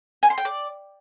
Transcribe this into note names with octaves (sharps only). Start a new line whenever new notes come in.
G#5
C6
G5
D5